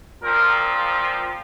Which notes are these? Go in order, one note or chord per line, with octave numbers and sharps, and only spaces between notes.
A#2 F3 C4 A#4